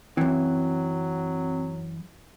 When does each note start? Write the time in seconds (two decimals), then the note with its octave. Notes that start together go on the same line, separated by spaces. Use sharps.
0.17 F#2 E3 F#3 C4